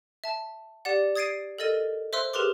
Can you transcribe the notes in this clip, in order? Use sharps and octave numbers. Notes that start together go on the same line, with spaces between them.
E5 A5
G4 D5 F#5
D#6 G#6 A6 C7 D7 D#7
A4 A#4 D#5 A6 D#7
C5 E5 C6 E6 F#6
G4 G#4 A#4 B4 C6 D6